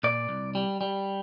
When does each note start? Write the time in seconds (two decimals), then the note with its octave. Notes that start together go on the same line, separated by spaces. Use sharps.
0.03 A#2 D5
0.29 C2
0.55 G3
0.81 G3